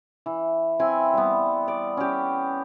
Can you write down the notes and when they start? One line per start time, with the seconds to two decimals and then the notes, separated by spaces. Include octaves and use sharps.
0.26 E3
0.79 C4 E4 G#5
1.13 G3 B3
1.68 D5
1.97 C#4 G4